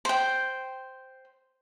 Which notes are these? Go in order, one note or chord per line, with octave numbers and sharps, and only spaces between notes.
C5 G5